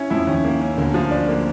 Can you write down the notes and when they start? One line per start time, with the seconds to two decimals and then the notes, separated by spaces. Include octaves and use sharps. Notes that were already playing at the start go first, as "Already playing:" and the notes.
Already playing: C#4 E4
0.10 F2 F3 E4
0.27 D#2 D#3 C#4
0.45 A#3
0.61 C#4
0.77 D2 D3 A#3
0.94 F3
1.11 D4
1.29 A#3